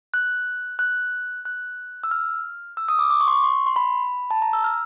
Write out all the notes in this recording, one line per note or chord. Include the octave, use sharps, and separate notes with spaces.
F#6
F#6
F#6
E6
F6
E6
D#6
D6
D6
C#6
C6
C#6
C6
C6
B5
A5
A#5
E6
F6